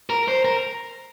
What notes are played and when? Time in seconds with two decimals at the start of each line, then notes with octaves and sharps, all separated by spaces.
0.10 A#4
0.28 C5
0.45 A#4